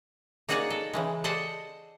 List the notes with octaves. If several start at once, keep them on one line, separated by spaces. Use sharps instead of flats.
A#3 D#4 F#4 G#4 C#5 D5
A4
C#3 E3 G#3
G#4 A4 C5 D5 D#5 F#5